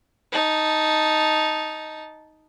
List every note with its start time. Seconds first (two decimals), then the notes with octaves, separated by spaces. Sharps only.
0.32 D#4 A5